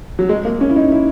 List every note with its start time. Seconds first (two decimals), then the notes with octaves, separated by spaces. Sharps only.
0.19 F#3
0.29 G#3
0.45 A#3
0.61 C#4
0.70 E4
0.76 D#4
0.92 E4